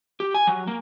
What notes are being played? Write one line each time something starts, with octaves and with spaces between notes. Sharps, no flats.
G4
G#5
F#3
A#3